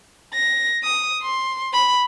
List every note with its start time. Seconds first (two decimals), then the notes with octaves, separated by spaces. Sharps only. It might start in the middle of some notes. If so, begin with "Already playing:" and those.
0.34 A#6
0.84 D#6
1.23 C6
1.73 B5